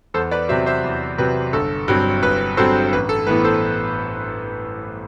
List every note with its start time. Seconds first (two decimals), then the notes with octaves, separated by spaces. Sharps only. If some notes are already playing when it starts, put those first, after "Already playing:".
0.14 E2 A4 C5
0.31 B4 D5
0.49 C3 F#3 C5 E5
0.66 C5 E5
0.84 E2
1.18 C3 F#3 B4
1.53 G1 A4
1.88 G2 F#3 C4
2.22 G1 B4
2.57 G2 F#3 C4 A4 C5
2.93 A1 B4
3.09 A4
3.27 A2 E3 B3 B4
3.44 A4 C5